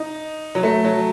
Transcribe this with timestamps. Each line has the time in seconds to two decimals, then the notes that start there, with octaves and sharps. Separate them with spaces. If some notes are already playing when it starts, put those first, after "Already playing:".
Already playing: D#4
0.55 F#3
0.63 A3
0.84 F#3